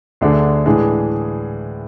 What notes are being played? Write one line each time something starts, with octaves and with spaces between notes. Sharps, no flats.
D2 D3 A3 D4 G#4
A2 E3 G#3 D4 G#4